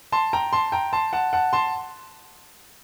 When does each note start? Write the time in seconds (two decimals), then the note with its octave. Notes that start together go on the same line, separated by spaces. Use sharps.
0.12 A5 C6
0.33 G5 A#5
0.53 A5 C6
0.72 G5 A#5
0.93 A5 C6
1.13 F#5 A5
1.33 F#5 A5
1.53 A5 C6